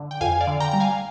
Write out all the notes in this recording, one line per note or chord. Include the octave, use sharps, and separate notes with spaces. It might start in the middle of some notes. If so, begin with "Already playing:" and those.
Already playing: D3
G5
F2 F5 G#5
D5 F5
D3
G5 A#5
G3 A#5
F5 G#5